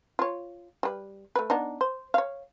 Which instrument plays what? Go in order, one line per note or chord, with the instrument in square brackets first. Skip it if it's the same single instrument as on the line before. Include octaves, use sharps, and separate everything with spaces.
[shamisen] F4 C#5
G3 B4
A3 B4
B3 D4 D#4
C5
C#5 F5